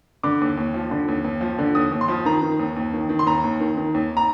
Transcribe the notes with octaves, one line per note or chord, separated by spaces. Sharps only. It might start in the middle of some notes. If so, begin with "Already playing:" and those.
D3 D6
D#2
D#2
F3
D3
D#2
D#2
F3
D3
D#2 D#6
D#2
C6
F3
D#3 A#5
D#3
D#2
D#2
D#3
D#3
C6
D#2 A#5
D#2
D#3
D#3
D#2
A#5